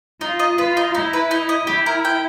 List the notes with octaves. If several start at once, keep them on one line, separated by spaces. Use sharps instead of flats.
D#4 F4
D#5
F4 B4
D#4
D#4 E4
B4
D#4
D#5
E4 G4
A#4
G5